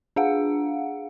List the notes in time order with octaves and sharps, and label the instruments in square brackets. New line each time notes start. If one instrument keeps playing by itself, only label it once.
[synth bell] D4 G#4 F5 F#5